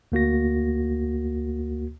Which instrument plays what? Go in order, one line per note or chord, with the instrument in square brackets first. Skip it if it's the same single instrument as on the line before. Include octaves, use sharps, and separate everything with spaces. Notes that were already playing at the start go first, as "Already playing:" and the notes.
[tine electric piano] D2 A#3 F#4 A#6